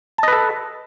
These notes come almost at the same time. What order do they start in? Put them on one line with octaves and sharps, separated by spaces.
A5 D#5 B4 A4